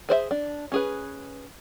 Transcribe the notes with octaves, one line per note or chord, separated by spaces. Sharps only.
G#4 C5 D5 E5
D4
C#4 G#4 B4